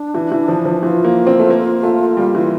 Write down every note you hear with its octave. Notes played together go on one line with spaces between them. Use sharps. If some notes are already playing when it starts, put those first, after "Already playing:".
Already playing: D4
E3
E3
F3
F3
E3 F4
A#3
C4
A3
A#3
A3
G3
E3